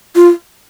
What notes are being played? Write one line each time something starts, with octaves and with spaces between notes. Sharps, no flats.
F4